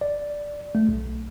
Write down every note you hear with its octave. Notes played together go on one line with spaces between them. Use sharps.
D5
A3
B1